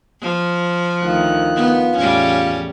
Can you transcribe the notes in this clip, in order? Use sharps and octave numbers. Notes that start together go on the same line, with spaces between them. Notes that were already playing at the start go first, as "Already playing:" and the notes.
F3
D2 D#3 F4 F#6
B3
E2 A2 G3 C#4